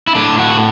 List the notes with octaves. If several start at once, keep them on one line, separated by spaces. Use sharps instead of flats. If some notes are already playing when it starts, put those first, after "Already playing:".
E4
A2 D4
F#4